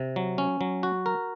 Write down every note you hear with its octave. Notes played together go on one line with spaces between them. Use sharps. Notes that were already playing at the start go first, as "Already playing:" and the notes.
Already playing: C3
F#3
C#4
F#3
F#4
A#4